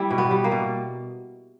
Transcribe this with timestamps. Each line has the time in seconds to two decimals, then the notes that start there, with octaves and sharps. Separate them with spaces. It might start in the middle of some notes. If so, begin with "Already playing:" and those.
Already playing: G3 E4
0.11 B2
0.18 B3
0.31 G3
0.44 A#3
0.52 B2